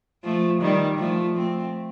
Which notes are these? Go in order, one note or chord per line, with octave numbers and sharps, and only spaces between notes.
F3 A3
D#3 G3
F3 A3
A3 C4